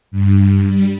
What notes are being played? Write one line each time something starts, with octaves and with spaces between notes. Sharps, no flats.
G2
G3